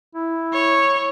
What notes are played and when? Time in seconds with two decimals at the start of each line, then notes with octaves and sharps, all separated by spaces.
0.15 E4
0.53 C#5